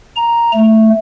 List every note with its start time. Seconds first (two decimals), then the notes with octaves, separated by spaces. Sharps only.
0.16 A#5
0.54 A3